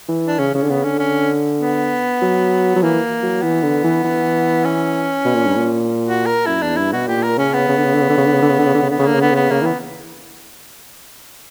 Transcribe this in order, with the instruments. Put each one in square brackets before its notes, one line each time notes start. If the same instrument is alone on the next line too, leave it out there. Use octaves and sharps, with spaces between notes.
[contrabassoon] E3
[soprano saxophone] D4
[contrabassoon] C#3 [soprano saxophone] C#4
[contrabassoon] C#3 [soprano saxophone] C#4
[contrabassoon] D3
[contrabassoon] C#3 [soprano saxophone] B3
[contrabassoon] D3 [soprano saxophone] C#4
[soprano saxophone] C#4
B3
[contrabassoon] F#3
F#3
[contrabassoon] E3 [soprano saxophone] A#3
[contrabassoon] F#3
[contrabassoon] E3 [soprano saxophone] B3
[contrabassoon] D3
E3
E3
[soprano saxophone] C#4
[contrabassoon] B2
A#2
G2
A#2
[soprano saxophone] F#4
A#4
[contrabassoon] F#2 [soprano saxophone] E4
[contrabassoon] E2 [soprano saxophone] D4
[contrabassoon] G2 [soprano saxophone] E4
[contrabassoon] B2 [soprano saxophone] F#4
[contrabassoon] A#2 [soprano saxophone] G4
[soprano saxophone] A#4
[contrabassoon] C#3 [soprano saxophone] C#4
[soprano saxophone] B3
[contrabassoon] C#3
D3
C#3
D3
C#3
D3
C#3
D3
C#3
D3
C#3
D3
C#3
D3
C#3
[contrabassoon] D3 [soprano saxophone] B3
[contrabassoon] C#3
[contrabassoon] D3 [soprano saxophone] A#3
[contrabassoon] C#3
[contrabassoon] D3 [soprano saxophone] B3
[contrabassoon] C#3 [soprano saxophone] B3
[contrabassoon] C#3 [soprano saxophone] A#3
[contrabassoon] E3 [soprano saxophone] B3